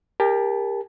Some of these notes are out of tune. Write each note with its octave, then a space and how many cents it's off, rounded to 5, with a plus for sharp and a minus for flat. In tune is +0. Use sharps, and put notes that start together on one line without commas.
G4 +30 A#4 +0 A5 -25